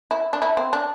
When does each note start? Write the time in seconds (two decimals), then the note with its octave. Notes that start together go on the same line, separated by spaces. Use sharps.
0.11 E4
0.33 D4
0.42 E4
0.57 C4
0.73 D4